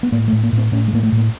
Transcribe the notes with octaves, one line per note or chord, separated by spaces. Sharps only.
B3
A2 A#3
A3
A2
A#3
A2
C4
A2 C#4
G#3
A2 A#3
A3
A2
A#3